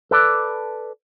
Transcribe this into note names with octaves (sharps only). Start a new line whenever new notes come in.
A4 B4 D5